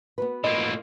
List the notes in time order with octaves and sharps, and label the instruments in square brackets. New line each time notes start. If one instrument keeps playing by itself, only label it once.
[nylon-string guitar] B3 F#4 B4
[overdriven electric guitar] A2 A#3 [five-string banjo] F4 D#5